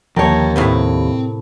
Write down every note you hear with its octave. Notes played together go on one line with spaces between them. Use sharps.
D#2 D3 F3 A#4 C#5 G5 A5
A2 C3 B3 C4